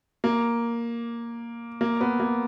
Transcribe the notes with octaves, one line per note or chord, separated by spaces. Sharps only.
A#3
A#3
B3
A#3